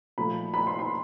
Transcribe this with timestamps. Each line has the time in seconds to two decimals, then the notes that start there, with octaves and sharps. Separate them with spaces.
0.18 A#2 F3 A3 B5
0.54 B5
0.67 C6
0.79 C6